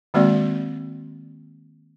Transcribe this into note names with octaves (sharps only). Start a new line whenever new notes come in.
D#3 G#3 A#3 C4 F#4 D5